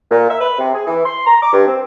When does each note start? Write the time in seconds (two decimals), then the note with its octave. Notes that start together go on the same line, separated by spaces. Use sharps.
0.10 A#2
0.29 E5
0.40 B4
0.59 C3
0.74 G#4
0.87 E3
1.04 C6
1.25 A#5
1.42 D6
1.53 G2
1.66 C4